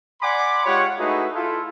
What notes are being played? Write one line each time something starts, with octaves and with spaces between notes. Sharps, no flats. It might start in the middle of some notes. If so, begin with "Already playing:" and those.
D5 F#5 G#5 B5 C6 D6
G#3 F4 G4 C#5 F#5
A3 D#4 E4 F#4 G#4 B4
E4 F4 A4